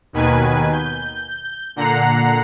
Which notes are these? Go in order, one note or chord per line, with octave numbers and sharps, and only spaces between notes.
D#2 B2 D#3 B4 G#5
G6
A#2 D3 F#5 A#5 C7